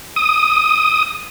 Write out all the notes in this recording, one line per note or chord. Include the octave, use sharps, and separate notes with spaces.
D#6